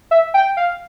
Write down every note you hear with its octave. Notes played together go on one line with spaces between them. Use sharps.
E5
G5
F5